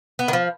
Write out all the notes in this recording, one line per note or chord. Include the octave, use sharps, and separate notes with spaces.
B3
D#3
F3